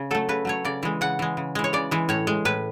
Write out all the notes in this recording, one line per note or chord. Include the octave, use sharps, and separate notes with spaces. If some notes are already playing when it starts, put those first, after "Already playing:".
Already playing: C#3
F#3 A3 A4
C#3 B4
F#3 A3 C#5
C#3 D5
E3 G#3
C#3 F#5
E3 G#3
C#3
E3 G#3
C#5
C#3 D5
E3 G#3
A2 C#5
G#3
A2 B4